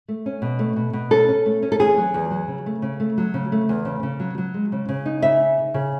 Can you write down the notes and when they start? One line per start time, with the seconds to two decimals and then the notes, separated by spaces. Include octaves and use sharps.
0.08 A3
0.26 C#4
0.42 B2
0.59 A3
0.76 B2
0.93 B2
1.11 C#4 A4
1.28 C#4
1.46 A3
1.62 C#4
1.72 A4
1.79 E2 G#4
1.97 F#3
2.14 E2
2.31 F#3
2.48 C#3
2.66 A3
2.82 C#3
3.00 A3
3.18 F#3
3.34 C#3
3.52 A3
3.69 E2
3.85 C#3
4.03 C#3
4.20 F#3
4.38 F#3
4.54 G#3
4.72 C#3
4.89 C#3
5.06 D#4
5.22 C#3 E5
5.40 D#4
5.57 D#4
5.74 C#3